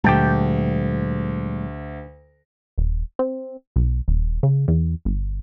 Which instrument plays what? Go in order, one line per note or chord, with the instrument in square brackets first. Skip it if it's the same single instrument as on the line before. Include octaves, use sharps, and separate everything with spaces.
[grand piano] D2 [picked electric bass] A#2 F#3 G#3 [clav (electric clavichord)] G4 G5 A5
[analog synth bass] D#1
C4
B1
D#1
C#3
E2
G1